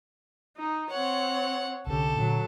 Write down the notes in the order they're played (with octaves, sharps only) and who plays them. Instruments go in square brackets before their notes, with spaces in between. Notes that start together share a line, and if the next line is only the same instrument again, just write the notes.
[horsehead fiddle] D#4
[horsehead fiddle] C4 C#5 [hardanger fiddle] F#5
[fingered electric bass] C2 D3 [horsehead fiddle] C#4 G4 [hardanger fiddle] A4
[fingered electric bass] A#2 D3 [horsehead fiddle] F#3